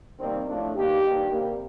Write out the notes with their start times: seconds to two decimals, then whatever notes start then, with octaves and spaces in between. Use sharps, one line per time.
0.20 C3 D#3 G3 A#3 C4
0.48 A2 F3 A3 D4
0.76 G2 D#3 A#3 G4
1.04 G2 D#3 A#3
1.32 C3 G3 A#3